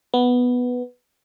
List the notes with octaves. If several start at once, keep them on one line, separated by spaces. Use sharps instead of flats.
B3